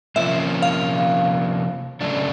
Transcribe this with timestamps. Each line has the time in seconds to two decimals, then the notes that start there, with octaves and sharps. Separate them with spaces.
0.16 C3 F3 A#3 C#4 F4 E5
0.62 F5
2.01 C#3 F#3 A3 D4